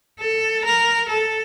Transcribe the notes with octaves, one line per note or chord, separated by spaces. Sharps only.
A4
A#4
A4